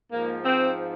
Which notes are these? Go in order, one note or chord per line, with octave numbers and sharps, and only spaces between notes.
G#2 F3 A#3
C4